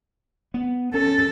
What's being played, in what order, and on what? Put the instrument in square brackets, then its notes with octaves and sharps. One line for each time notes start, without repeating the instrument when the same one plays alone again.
[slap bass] B3
[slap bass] C#4 [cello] A4